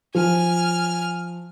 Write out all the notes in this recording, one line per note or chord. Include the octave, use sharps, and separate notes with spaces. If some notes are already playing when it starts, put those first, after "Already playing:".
F3 G#5 F6